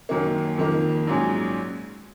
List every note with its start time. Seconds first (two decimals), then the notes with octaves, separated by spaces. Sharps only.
0.09 F#2 D#3 F#3 A#3
0.58 F2 D#3 A#3
1.07 A#1 G#2 F#3 C#4 G#4